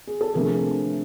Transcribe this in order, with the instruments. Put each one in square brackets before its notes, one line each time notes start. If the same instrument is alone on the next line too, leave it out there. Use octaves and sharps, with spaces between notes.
[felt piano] G#4
A4
C3 F3 A3 D4 G#4 A#4